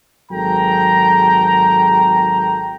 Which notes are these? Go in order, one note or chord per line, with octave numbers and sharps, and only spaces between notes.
G#1 F#3 G#4 A4 G5 A#5